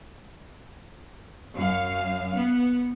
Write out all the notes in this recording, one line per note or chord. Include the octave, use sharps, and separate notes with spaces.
F#2 F5
B3